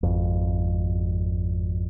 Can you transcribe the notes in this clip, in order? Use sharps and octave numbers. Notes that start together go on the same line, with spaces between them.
G#1 F2